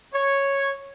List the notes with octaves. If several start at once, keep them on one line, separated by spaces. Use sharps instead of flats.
C#5